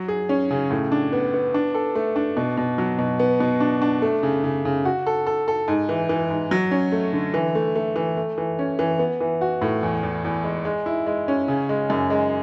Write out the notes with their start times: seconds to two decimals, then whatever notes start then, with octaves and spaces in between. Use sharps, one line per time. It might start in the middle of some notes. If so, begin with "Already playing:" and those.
Already playing: F#3
0.08 G#4
0.29 C#4
0.51 C#3
0.70 A2
0.92 D4
1.13 B3
1.34 B3
1.54 D4
1.75 A4
1.95 A3
2.16 D4
2.37 B2
2.57 B2
2.78 F#3
2.99 B2
3.20 B3
3.40 B2
3.60 D4
3.82 D4
4.02 A3
4.23 C#3
4.44 C#3
4.65 C#3
4.85 F#4
5.07 A4
5.27 A4
5.48 A4
5.68 G#2
5.89 E3
6.09 E3
6.31 G#2
6.51 F#3
6.71 C#4
6.92 A3
7.13 D3
7.34 E3
7.55 A3
7.76 A3
7.96 E3
8.17 A3
8.38 E3
8.59 C#4
8.79 E3
8.99 B3
9.21 E3
9.41 F#4
9.62 A2
9.83 E2
10.03 E2
10.24 E2
10.44 G#3
10.65 G#3
10.86 E4
11.06 G#3
11.28 C#4
11.48 C#3
11.69 G#3
11.90 F#2
12.10 G#3